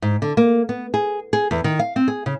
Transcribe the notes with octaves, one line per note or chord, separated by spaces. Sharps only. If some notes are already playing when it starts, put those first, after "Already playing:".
G#2
D3
A#3
B3
G#4
G#4
E2
D#3
F5
C4
G#4
C#3